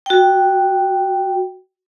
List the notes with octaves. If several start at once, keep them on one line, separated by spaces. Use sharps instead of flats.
F#4 G5